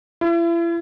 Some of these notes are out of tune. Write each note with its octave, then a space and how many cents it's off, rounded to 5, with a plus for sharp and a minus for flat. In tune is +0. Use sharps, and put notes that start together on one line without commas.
E4 +40